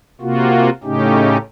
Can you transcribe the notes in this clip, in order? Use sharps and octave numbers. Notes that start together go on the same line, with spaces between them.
C3 A#3 F4 F#4
A2 C#3 A3 C#4 D#4 G4